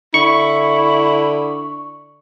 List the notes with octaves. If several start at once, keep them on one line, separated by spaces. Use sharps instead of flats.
D3 E4 C#6